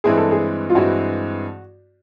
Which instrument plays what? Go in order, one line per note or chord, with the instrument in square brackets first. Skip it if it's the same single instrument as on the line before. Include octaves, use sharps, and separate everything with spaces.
[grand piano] G2 E3 G#3 C4 E4 [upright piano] G#4
[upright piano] A4
G#4
F4
[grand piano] G2 E3 G#3 C4 E4 [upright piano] F#4